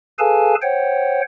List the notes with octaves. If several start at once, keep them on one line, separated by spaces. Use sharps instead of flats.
G#4 A4 B4 F5 G#5 A5
C5 C#5 F#5 G5